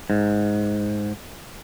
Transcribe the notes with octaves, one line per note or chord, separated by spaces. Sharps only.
G#2